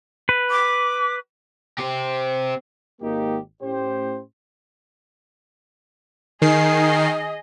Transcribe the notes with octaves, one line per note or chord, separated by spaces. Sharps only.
B4
D6
C4 G4
G#1 A#3 D#4 G4
A2 C#4 G4 C5
D#3 G#4 D#5 C7